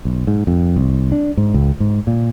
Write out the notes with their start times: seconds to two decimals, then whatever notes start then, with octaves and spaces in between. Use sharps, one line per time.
0.05 B1
0.27 G#2
0.47 F2
0.76 C2
1.12 D4
1.37 G#2
1.54 C#2
1.80 G#2
2.07 A#2